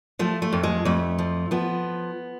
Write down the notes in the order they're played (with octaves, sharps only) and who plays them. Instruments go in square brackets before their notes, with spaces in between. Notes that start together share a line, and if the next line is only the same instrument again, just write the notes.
[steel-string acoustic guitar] F3 A3
A3
F2
G#3
F2 A3
F3
F3 B3